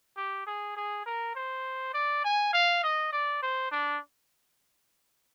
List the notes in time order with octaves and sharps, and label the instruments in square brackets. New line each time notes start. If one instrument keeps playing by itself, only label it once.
[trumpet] G4
G#4
G#4
A#4
C5
D5
G#5
F5
D#5
D5
C5
D4